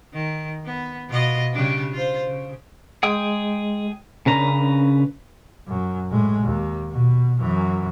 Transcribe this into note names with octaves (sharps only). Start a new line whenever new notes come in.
D#3
B3
B2 F4 D#5
C#3 G3 D4
F4 C5
C#3
G#3 G#4 G5 D#6
C#3 C#4 D4 A#4 B4 A#5
F#2
A2 G#3
D#2
B2
F#2 E3